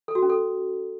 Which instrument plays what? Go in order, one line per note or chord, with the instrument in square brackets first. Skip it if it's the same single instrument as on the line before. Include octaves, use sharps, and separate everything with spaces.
[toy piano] A4
F#4
C#4
A4